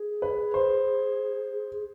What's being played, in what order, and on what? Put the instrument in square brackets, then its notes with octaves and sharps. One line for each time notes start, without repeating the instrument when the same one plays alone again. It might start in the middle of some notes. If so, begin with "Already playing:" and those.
Already playing: [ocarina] G#4
[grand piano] B4
C5